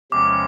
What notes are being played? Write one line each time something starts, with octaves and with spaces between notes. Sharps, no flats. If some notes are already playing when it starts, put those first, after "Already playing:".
E2 C3 F3 G#3 C#4 D6